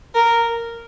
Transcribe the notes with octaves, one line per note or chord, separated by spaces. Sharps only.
A#4